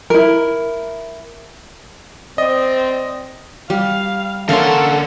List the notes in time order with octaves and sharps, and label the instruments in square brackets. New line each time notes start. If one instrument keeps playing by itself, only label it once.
[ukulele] E4 A#4
[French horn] C4 [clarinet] D5 [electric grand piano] D#5
[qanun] G3 [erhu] F5
[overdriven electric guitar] D3 C6 [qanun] A#3 C#4 D4 [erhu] A4 [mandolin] F5 F#5